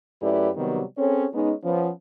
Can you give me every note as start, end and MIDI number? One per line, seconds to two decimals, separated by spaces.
0.22 0.50 42
0.22 0.50 57
0.22 0.50 64
0.22 0.50 67
0.22 0.50 71
0.22 0.50 74
0.56 0.83 48
0.56 0.83 51
0.56 0.83 54
0.56 0.83 55
0.56 0.83 59
0.97 1.26 60
0.97 1.26 61
0.97 1.26 68
0.97 1.26 69
0.97 1.26 73
1.33 1.53 56
1.33 1.53 59
1.33 1.53 61
1.33 1.53 63
1.64 1.90 53
1.64 1.90 59
1.64 1.90 61